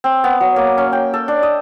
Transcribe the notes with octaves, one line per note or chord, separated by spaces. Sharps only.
C4
B3
F#3
A#3
C#4
G5
A4
D4
D#5